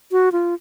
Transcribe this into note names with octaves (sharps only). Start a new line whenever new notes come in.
F#4
F4